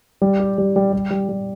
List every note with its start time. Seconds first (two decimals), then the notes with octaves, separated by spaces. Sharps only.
0.22 G3
0.40 G4
0.58 G3
0.76 G3
0.93 G3
1.10 G3
1.29 G3